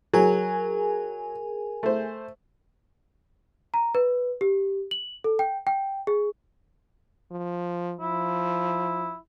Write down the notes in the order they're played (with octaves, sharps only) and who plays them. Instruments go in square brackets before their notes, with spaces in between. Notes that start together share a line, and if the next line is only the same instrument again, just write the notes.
[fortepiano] F#3 [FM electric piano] G#4 A#4 G#5
[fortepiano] A3 C5
[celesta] A#5
B4
G4
F#7
A4
G5
G5
G#4
[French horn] F3
[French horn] F3 [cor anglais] E4